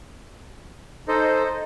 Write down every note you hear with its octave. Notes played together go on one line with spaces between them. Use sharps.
D#4 A4 C5 D#5